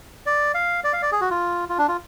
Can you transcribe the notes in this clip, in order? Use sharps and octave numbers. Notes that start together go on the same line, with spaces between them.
D5
F5
D5
F5
D5
G#4
F#4
F4
F4
D4
F4